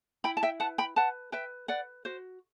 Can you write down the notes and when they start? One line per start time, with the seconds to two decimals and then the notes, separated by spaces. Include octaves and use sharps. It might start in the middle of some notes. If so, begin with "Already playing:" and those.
0.24 E4 G5 B5
0.37 A5
0.43 E5 G5
0.60 B4 F#5 A5
0.78 G5 B5
0.96 B4 F#5 A5
1.32 B4 E5 G5
1.68 B4 D5 F#5
2.05 F#4 C5